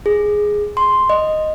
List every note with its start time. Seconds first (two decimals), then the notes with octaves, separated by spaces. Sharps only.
0.06 G#4
0.77 C6
1.10 D#5